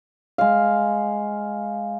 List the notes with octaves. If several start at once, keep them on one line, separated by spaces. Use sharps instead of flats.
G#3 F5